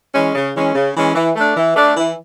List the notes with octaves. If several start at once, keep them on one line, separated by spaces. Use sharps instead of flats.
E3 G#3 C#4
C#3
E3 G#3 C#4
C#3
E3 G#3 C#4
E3
A3 D4
E3
A3 D4
E3